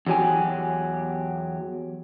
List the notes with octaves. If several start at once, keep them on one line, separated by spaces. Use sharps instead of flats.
E2 F#3 G4 G#5